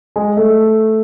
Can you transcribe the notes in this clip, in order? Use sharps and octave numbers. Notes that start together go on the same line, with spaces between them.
G#3
A3